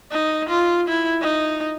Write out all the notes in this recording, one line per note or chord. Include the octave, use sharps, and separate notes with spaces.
D#4
F4
E4
D#4